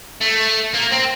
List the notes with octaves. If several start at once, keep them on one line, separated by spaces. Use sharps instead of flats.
A3
A#3
C4